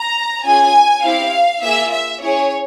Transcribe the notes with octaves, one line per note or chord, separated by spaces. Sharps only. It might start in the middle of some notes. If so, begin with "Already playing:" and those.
Already playing: A#5
C#4 F4 G#4 G#5
C4 E4 G4 F5
A#3 F4 G#4 E5
E5
C#4 E4 G#4 C#5